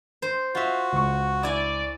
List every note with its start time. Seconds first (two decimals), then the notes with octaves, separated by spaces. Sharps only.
0.22 C5
0.55 F4 F#4 E5
0.93 C#2 C#6
1.43 E4 D5 G#5